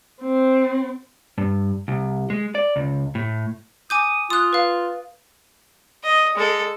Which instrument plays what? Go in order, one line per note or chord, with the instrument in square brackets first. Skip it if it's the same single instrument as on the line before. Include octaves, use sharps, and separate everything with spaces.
[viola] C4
[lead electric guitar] G2
C2
G#3
D5
C#2
A2
[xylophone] G#5 D6 G6 [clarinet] D#6
[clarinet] F4 [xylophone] D#6 F#6
[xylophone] B4 F5
[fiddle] D#5
G#3 A4